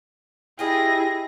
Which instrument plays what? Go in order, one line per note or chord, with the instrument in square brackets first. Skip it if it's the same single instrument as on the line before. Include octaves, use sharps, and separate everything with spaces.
[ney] E4 [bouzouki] F4 G4 D#5 [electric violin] G#4 A#6